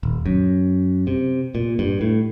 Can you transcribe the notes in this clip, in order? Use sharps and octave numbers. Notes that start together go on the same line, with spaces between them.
D#1
F#2
C3
A#2
G2
A2